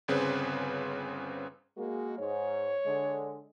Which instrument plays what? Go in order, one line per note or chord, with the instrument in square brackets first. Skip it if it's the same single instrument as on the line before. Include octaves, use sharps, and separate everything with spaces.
[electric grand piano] G1 C#3 C4 G#4 B4
[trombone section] G#3 A#3 [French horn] F#4
[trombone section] G#2 [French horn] C#5
[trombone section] D3 G#3